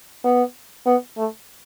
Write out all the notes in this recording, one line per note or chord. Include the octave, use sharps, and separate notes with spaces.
B3
B3
A3